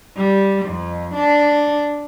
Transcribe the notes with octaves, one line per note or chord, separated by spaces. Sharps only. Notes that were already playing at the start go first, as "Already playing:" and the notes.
G3
F2
D4